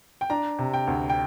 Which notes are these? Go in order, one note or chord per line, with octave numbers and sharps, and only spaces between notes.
G5
D4 A#5
C3
G5
D2
G5